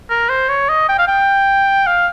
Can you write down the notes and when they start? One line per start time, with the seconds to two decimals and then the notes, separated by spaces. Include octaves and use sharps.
0.10 A#4
0.29 C5
0.49 C#5
0.69 D#5
0.89 G5
0.98 F5
1.08 G5
1.87 F5